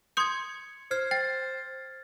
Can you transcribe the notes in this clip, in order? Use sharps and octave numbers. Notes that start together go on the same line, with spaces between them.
C6 D#6 G6 G#6 C#7
C5 F6 G#6 C7
G5 A6